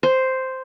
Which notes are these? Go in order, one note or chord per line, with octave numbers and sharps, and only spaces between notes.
C5